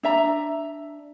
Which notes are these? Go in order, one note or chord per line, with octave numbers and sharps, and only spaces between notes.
D4 E5 A#5